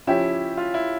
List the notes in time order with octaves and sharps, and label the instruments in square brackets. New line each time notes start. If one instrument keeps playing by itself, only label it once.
[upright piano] F3 C#4 G4 [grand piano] E4
[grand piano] F4
E4